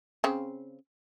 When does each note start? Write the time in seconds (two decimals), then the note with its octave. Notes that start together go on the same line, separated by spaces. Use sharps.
0.24 C#3 C4